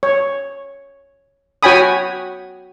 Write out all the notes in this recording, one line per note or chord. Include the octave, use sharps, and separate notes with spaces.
C#5
F#4 C#5 G5 G#5 B5 D#6